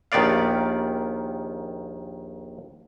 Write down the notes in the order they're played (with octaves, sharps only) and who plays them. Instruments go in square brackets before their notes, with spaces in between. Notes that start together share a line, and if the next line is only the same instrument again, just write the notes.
[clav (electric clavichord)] A#1 D#2 D#3 B3 D5 F5